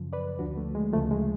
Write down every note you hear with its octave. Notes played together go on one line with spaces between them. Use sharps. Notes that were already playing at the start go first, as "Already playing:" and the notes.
Already playing: F#2 C#3 F3
B4 D5
D2 D3 F3 D4 F#4
A3
G#3
D2 C#3 F3 A3
G#3